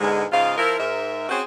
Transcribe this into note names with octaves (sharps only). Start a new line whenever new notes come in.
E2 G#2 D3 G#3
G#2 C#3 F4 D#5 F5
F3 E4 A#4
G#2 A#4 E5
C4 C#4 F#4 G#4 C5 C#5